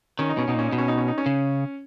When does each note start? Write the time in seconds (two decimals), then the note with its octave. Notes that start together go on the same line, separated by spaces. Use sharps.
0.19 D#3 C#4
0.29 D#4
0.37 B2 C#4
0.48 B2 D#4
0.55 A#2 C#4
0.68 B2 D#4
0.78 C#4
0.88 D#4
0.98 C#4
1.08 D#4
1.18 C#4
1.26 C#3